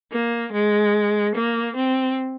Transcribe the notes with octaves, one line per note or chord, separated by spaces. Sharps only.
A#3
G#3
A#3
C4